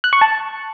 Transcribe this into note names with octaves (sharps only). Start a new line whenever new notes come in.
F#6
C#6
A5